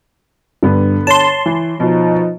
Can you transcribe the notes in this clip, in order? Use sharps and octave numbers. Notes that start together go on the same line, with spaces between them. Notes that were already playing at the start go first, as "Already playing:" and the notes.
G2 D3 B3
C#5 A5 C6
E3
B2 F3 D#4